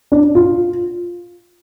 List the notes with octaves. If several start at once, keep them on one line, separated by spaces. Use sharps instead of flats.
D4
F4